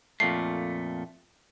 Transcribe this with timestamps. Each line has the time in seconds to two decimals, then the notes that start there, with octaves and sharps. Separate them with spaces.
0.20 F2 A#2 A3 C7